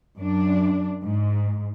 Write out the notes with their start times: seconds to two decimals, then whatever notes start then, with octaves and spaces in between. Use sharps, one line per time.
0.17 F#2 D4
1.04 G#2